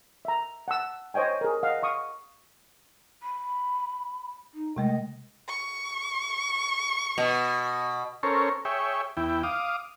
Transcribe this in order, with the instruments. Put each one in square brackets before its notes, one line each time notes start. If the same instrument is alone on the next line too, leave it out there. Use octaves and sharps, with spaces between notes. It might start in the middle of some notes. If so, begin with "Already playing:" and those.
[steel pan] E5 A#5
F#5 A5 E6
C5 C#5 D#5 G5 G#5
G#4 A#4
D#5 F5 F#5
F5 C#6 D#6
[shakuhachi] B5
D#4
[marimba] C3 G#3 A3 [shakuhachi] D#5
[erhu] C#6
[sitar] B2
[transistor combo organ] C#4 A4 A#4 C5 C#5
G#4 C#5 E5 G5
E2 E4 G5
F5 D6 D#6